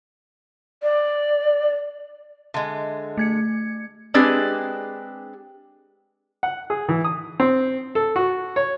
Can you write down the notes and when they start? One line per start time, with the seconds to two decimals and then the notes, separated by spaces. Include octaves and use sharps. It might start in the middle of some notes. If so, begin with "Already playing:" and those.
0.83 D5
2.54 D3 G#3 E5
3.17 A3 G#6 C#7
4.14 G#3 C4 D4 G4 G#4 B4
6.43 F#5
6.70 G#4
6.89 E3
7.04 D#6
7.40 C4
7.95 A4
8.16 F#4
8.56 C#5